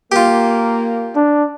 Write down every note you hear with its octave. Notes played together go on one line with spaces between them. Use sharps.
A#3 F4 G4
D4